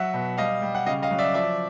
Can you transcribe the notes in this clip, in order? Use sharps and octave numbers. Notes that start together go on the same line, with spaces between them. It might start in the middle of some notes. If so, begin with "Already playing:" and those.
Already playing: F#3 E5 F#5
B2
G3 D#5 F5
G3
F#5
C#3 D#5 F5
D#5 F5
F#3
D5 E5
F3 D5 E5